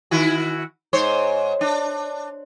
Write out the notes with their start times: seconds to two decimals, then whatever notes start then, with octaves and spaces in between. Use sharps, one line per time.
0.11 D#3 E4 F#4
0.93 G#2 C5 C#5
1.61 D4